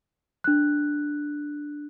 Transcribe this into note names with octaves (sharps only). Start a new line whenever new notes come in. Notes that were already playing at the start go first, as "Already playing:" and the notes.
D4 F#6